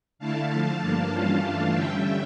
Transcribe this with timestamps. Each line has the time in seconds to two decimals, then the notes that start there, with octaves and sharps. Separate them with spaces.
0.19 D3 A3 E4 F5 A5
0.50 D3 F3 A3 F5 A5
0.81 G2 F3 A#3 D4
1.12 E3 G3 C#4 F4 F5 A5
1.43 G2 E3 A3 D4 F4
1.74 D3 G3 C#4 E5 G5